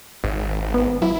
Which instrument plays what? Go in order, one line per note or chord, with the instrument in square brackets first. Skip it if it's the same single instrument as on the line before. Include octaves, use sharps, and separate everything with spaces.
[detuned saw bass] G#1
[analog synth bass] B3
[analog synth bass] F#3 [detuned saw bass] E4